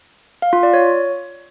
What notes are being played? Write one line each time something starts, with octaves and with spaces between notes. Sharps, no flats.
F5
F4
D5
C#5